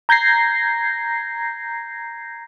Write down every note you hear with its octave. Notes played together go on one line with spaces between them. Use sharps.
A#5 G6 G#6 A#6 C7